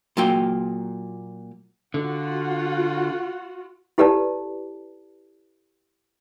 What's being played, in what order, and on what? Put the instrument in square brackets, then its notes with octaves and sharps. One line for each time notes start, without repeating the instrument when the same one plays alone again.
[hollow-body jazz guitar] A#2 F#3 F4 G5
[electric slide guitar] D3 [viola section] F4 F#4 F#5
[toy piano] E4 G4 A4 B4 D5 A5